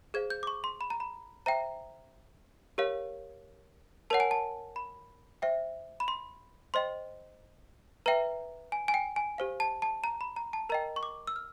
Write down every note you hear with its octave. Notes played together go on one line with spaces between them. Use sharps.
G#4 C5 F5 G#6
G6
D6
C#6
C6
B5
A#5
B5
C5 E5 G5 A#5
G4 A#4 C#5 F5
A#4 C#5 F#5 A5
G#5
A5
B5
C5 E5 G5
B5
C6
C5 D#5 G5 C6
B4 E5 G5 A#5
G#5
G#5
G5
G#5
G4 C5 F5
A5
A5
A#5
B5
A#5
A5
A#4 D#5 G5 A#5
C#6
D6
E6
F6